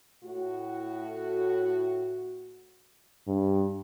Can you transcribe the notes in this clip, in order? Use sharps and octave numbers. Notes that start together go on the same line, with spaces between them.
A2 F#4
G2